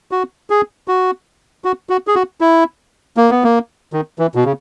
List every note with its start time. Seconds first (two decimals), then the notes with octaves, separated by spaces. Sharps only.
0.11 F#4
0.50 G#4
0.88 F#4
1.65 F#4
1.90 F#4
2.07 G#4
2.15 F#4
2.41 E4
3.17 A#3
3.30 B3
3.44 A#3
3.93 D#3
4.19 E3
4.35 B2
4.45 C#3